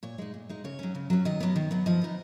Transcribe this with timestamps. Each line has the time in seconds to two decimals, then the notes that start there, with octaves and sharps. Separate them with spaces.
0.03 A#2 C#5
0.18 G#3 D#4
0.34 A#2
0.49 G#3 D#4
0.64 C#3 C#5
0.79 F#3 C#4
0.95 C#3
1.10 F#3 C#4
1.25 D#3 D#5
1.40 F#3 B3
1.56 D#3
1.71 F#3 B3
1.86 F3 D#5
2.02 B3 D#4